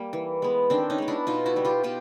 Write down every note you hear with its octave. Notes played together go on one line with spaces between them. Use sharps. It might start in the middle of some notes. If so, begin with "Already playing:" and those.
Already playing: G3 A#3
E3
G#3 B3
D#3 C4 D4
C#4 D#4
G#3 B3
D4 E4
B2 D#4 F4
E4 F#4
G3 B3
F4 G4
B2 F4 G4